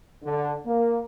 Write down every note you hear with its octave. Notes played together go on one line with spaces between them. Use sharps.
D3
A#3